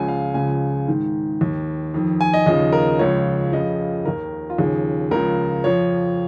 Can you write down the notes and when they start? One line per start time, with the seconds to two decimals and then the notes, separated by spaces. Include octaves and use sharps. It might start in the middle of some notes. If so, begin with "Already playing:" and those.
Already playing: C#2 C#3 F3 G#5
0.08 F5
0.34 C#2 C#3 F3 G#5
0.88 G#2 D#3
1.41 D#2 D#3
1.94 F2 D#3
2.21 G#5
2.33 D#5
2.46 D#2 C#3 F3 D#5
2.73 A#4
2.99 C#2 C#3 F3 C#5
3.52 F2 C#3 F3 D#5
4.05 D#2 D#3 A#4
4.50 F4
4.58 D#2 C#3 F3 G#4
5.11 C#2 C#3 F3 A#4
5.64 F2 F3 C#5